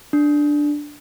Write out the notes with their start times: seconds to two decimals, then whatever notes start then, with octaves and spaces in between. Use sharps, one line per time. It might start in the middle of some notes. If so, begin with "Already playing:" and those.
0.13 D4